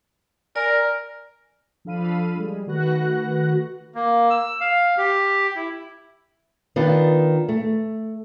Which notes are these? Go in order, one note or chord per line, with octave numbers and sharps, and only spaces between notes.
A#4 D5 G#5
F3 D4 A4 F5 B5 D#7
G3 G#3 G#4
D#3 A3 F#4 B4 F#6 A#6
A#3
E6
F5
G4
E4
D#3 B3 D4 F4
A3